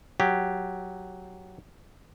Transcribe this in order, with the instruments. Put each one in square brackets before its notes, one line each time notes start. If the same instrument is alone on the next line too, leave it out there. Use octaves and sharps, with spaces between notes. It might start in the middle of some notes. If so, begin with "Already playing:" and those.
[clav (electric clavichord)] F#3 G4